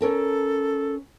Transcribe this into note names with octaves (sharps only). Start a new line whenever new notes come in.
C#4 A4 A#4 A5